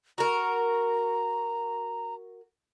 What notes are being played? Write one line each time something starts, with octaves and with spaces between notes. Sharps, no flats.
F#4 A#4 A#5